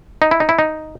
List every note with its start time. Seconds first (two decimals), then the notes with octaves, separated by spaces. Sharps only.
0.22 D#4
0.31 E4
0.40 D#4
0.49 E4
0.59 D#4